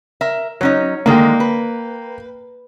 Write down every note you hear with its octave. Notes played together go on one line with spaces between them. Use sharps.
A#4 E5
F#3 C#4 D#4 C#5
D3 D#3 G#3 A#3 G5
B4